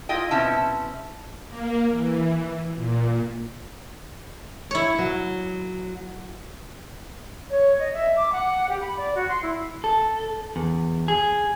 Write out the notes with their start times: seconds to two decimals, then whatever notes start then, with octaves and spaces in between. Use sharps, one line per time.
0.09 E4 F4 D#5 G5
0.31 B2 C4 C#4 E4 E5 A5
1.48 A#3
1.92 E3
2.75 A#2
4.71 E4 C#5
4.99 F#3
7.50 C#5
7.79 D#5
7.93 E5
8.16 D6
8.32 F#5
8.69 G4
8.81 B5
8.97 D5
9.15 F#4
9.28 C6
9.42 E4
9.84 A4
10.56 E2
11.08 G#4